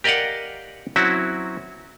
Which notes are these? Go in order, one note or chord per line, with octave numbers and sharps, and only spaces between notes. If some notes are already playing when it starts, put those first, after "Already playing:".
G4 A#4 D5 D#5 F5 F#5
F#3 C4 C#4 E4 F#4